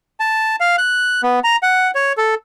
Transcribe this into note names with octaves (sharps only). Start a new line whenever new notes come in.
A5
F5
F#6
B3
A#5
F#5
C#5
A4